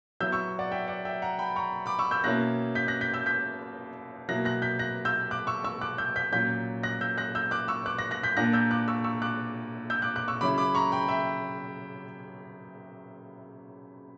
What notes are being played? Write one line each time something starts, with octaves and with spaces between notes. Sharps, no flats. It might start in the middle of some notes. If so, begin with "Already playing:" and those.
F#3 B3 E4 E6 G6
C#6 E6
D5 F#5
E5 G5
D5 F#5
E5 G5
F#5 A#5
G5 B5
A#5 C#6
B5 D6
C#6 E6
E6 G6
B2 A#3 C#4 E4 F#6 A#6
G6 B6
F#6 A#6
G6 B6
E6 G6
G6 B6
B2 F#3 A#3 E4 F#6 A#6
F#6 A#6
G6 B6
F#6 A#6
E6 G6
D6 F#6
C#6 E6
C#6 E6
D6 F#6
E6 G6
G6 B6
A#2 F#3 C#4 G6 B6
F#6 A#6
E6 G6
F#6 A#6
E6 G6
D6 F#6
C#6 E6
D6 F#6
F#6 A#6
F#6 A#6
G6 B6
A#2 A#3 D4 F#6 A#6
E6 G6
D6 F#6
C#6 E6
C#6 E6
D6 F#6
E6 G6
D6 F#6
D6 F#6
C#6 E6
C#3 F#3 C#4 E4 B5 D6
B5 D6
A#5 C#6
G5 B5
E5 G5